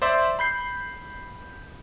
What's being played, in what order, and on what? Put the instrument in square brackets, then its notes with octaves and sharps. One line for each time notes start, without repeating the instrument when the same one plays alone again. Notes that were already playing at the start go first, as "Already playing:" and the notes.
[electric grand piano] C5 D5 E5 C6 D6
B5 G6 C7